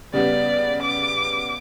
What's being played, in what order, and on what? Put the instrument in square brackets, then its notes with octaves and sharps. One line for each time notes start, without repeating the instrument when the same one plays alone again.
[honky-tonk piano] C#3 G3 B3 [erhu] D5
[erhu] D6